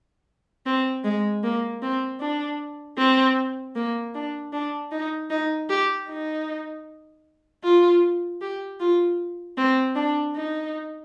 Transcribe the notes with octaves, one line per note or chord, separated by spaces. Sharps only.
C4
G#3
A#3
C4
D4
C4
A#3
D4
D4
D#4
D#4
G4
D#4
F4
G4
F4
C4
D4
D#4